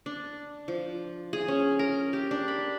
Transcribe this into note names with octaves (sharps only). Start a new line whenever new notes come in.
D4
F3
G#4
C#4
A#4
G4
D4
B5